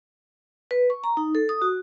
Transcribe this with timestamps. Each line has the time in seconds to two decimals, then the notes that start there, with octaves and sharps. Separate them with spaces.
0.71 B4
0.90 C#6
1.04 A#5
1.17 D#4
1.35 A4
1.49 D#6
1.62 F#4